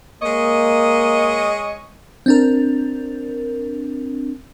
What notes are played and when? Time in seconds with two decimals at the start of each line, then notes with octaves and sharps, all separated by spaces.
0.22 G#3 A#3 C#5 D#5
2.26 C4 D4 A#4